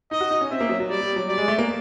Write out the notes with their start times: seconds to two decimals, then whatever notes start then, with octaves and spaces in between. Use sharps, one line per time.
0.11 D#4 D#5
0.21 F#4
0.31 D#4
0.41 C#4
0.50 C4 E5
0.61 A#3
0.69 F#3
0.80 F#3
0.90 G3 D5
1.03 G3
1.16 F#3
1.28 G3 D5
1.38 G#3
1.48 A3
1.59 A#3